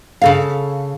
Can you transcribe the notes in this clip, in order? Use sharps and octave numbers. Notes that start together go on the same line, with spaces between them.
C#3 A4 F5